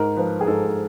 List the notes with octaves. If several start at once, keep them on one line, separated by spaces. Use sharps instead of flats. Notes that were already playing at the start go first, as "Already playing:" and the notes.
Already playing: G#2 A#4
F3 B4
G#4
G#2 A4